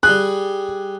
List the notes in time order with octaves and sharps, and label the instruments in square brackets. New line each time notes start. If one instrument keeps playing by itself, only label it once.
[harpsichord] G3 G#4 [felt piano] F#6